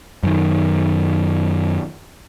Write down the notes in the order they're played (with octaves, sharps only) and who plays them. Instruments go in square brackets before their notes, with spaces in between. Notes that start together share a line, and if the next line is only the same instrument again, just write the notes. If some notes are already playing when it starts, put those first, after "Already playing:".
[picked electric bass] F#2 D#3